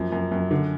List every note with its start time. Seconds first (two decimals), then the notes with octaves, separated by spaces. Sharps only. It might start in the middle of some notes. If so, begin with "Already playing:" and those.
Already playing: F#2 F3
0.12 F#2
0.32 F#2
0.51 D3